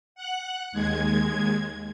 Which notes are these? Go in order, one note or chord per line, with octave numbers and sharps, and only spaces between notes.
F#5 F#6
D#2 G#3 G#6